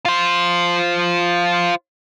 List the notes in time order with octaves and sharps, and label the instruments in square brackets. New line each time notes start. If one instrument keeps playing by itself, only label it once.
[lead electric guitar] F4 C5